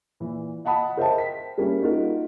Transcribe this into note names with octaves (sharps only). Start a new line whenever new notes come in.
A#2 E3
D#5 F#5 A5 B5 D#6
A#4 C5 D#5 E5 G5 A5
B6
G3 A#3 C#4 E4
A#3 D#4 F4 F#4 A#4